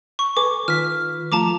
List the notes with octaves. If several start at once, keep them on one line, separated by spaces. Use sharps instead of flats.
C#6
A4 B4 G#5 D6
D#3 F4 B4 F6 B6
F3 A3 F4 A5 A#5 D6